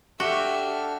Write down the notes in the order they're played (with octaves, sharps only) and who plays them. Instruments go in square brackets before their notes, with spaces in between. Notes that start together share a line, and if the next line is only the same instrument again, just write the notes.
[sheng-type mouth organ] D4 A4 F6 [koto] F#4 [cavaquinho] G4 [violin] E5